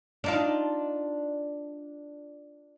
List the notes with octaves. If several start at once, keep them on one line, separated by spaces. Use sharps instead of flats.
D4 D#4 F4